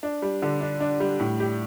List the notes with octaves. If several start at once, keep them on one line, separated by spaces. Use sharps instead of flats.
D4
G3
D3
D4
D4
G3
A2
G4